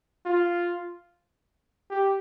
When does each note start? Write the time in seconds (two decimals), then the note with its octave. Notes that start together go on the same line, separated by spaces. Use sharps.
0.26 F4
1.90 G4